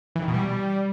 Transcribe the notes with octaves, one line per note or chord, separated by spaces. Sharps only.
E3
D#3
B2
G3